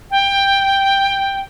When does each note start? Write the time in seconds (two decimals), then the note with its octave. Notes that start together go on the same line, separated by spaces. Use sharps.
0.11 G5